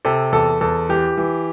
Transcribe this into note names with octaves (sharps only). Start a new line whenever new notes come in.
C3 A4
E2 A4
E2 A4
E3 G4
E3